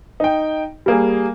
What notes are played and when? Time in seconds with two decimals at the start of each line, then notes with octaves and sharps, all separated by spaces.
0.20 D#4 G5
0.86 G3 A#3 G#4